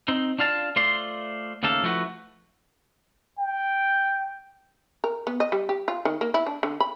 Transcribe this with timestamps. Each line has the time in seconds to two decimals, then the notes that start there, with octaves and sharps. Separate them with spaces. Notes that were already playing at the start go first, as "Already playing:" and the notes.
0.08 C4 D#4
0.39 D4 F4 F5 A5
0.76 A3 F4 C5 D5 C6
1.63 D#2 C#3 A3 A#3 A4 F5
1.83 F3 A3 E4 F#4 B4
3.39 G5
5.04 A#4
5.27 B3
5.40 D#5
5.52 G3
5.69 G4
5.88 F4
6.05 D#3
6.21 A#3
6.34 E4
6.46 D4
6.63 D3
6.80 B5